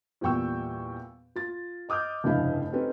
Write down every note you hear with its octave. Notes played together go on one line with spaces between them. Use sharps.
E2 A#2 G3 G5 C#6 E6
F4 A6
D#5 D6 D#6 F6 G6
F1 G2 C#3 E4 D#5 F5
C4 C#4 D#4 G4 A4 B4